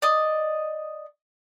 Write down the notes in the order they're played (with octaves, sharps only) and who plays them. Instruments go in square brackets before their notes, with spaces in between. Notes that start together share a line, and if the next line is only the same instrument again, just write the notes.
[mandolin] D5 D#5